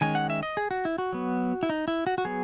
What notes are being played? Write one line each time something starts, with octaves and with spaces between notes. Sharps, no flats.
D#3 G#3 C#4 G#5
F#5
E5
D#5
G#4
F#4
E4
F#4
F#3 B3
E4
D#4
E4
F#4
F#4
F#3 B3 G#4